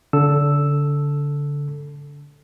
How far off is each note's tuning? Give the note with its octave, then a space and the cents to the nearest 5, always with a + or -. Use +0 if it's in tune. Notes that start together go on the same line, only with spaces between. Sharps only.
D3 -30 A4 +0 E6 +0